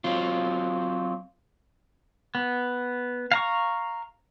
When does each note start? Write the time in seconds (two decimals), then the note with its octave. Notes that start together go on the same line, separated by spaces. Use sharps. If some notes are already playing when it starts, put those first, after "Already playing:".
0.04 F#3 C4 F4
2.35 B3
3.32 F5 A#5 C#6